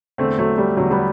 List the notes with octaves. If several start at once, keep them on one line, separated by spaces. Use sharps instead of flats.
E2 D3 A3 C4
F#3 A3
G3
E2 D3 F#3 A3
G3 B3